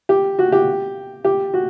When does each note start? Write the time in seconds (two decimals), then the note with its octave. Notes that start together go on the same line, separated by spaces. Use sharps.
0.09 G4
0.39 F#4
0.52 G4
1.25 G4
1.54 F#4